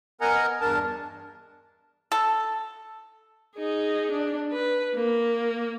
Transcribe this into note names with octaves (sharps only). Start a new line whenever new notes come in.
B3 A#4 D#5 F#5 G#5 A#5
E2 G2 D4 A#4 A5
A4
D#4 G#4
D4
B4
A#3